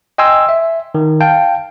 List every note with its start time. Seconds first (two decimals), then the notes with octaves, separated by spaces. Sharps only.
0.18 D#5 G5 G#5 C6 E6
0.49 E5
0.95 D#3
1.21 F5 G5 A5